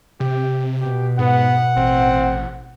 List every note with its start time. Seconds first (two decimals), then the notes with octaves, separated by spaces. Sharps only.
0.20 C3 G4
0.81 B2 G4
1.19 G#2 B3 F#5
1.77 A1 C4